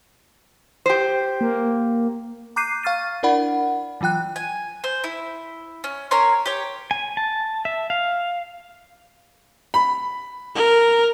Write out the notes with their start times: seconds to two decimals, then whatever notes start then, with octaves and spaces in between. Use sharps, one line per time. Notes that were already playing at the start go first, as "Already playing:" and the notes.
0.86 G4 C5
1.41 A#3
2.56 A#5 D6 F#6 G6 C7 D#7
2.83 F5 C#6 F6 A6 D#7
3.23 D4 E4 A#4 D5 F#5 B5
4.01 E3 F#3 F4 G5 F#6
4.36 G#5
4.84 C5
5.04 E4
5.84 C#4
6.11 C#4 A#4 C#5 C6
6.46 G4 C#5
6.91 G#5
7.17 A5
7.65 E5
7.90 F5
9.74 B5
10.56 A#4